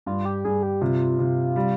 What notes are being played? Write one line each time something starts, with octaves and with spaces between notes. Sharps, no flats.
G2 F4
G4
G2 G#4
G4
C3 F4
C3
G3